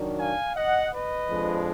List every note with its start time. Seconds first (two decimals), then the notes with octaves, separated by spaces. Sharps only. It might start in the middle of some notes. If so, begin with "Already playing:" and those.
Already playing: D#3 F#3 D4
0.18 F5 G#5
0.55 D#5 F#5
0.92 B4 D#5
1.29 F2 F3 G#3 D4